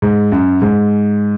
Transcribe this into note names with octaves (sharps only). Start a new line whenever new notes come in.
G#2
F#2
G#2